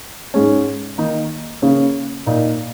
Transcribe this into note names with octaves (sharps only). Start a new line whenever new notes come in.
G#2 G#3 C#4
D#3 A#3 D#4
C#3 A#3 C#4
A#2 A#3 D#4